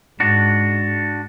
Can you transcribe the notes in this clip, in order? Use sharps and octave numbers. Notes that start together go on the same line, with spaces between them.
G#2 D4 F#4